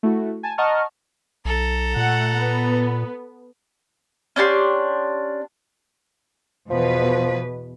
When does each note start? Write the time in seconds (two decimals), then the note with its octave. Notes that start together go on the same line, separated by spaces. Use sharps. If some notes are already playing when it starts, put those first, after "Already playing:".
0.03 A3 E4 F#4
0.43 G#5 A5
0.58 D#5 F#5 A5 A#5 C#6 F6
1.45 B1 A4 A#5
1.97 A#2 A3 F#5
2.37 B3
4.36 C#4 D4 G4 C6
6.70 E2 B2 F3 B4